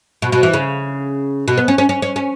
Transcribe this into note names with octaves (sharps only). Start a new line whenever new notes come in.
B2
B2
E3
C#3
B2
B3
C#4
C#4
C#4
C#4
C#4